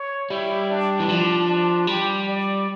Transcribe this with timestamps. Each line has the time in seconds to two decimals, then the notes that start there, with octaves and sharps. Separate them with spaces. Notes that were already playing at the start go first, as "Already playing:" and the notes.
Already playing: C#5
0.30 G3 E4
0.70 D4
1.00 E3
1.09 F3 D4
1.49 D4
1.87 G3 G4
2.27 D5